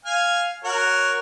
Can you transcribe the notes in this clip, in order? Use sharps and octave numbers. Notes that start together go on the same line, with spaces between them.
F5 G#5 F6
F#4 A#4 C#5